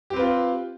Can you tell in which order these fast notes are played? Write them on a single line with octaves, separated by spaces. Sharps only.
G4 C4 B4 F4